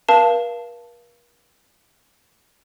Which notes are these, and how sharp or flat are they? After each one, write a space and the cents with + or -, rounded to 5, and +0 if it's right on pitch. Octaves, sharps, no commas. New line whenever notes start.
A#4 +45 F5 -20 A5 +0